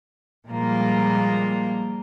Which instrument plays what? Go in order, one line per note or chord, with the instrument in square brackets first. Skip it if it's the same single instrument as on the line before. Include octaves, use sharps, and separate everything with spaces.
[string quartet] A#2 F3 G3 G#3 A#3 F4